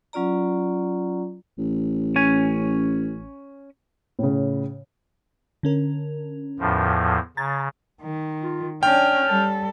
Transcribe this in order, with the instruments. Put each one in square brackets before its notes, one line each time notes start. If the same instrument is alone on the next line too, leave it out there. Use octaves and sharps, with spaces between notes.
[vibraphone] F#3 C#4 F4 D5 A#5
[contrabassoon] A1
[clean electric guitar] C#4 G#5
[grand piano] A2 C#3
[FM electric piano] D3 C#4 A#4
[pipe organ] E2 A2 F3
[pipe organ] C#3 [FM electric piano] A#5 G#6 A6
[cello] D#3
[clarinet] F4
[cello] C#4 D4 [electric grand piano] G5 [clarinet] F6
[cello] G3 A4